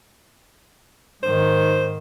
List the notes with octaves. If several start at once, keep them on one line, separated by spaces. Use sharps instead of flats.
G#2 D#3 C5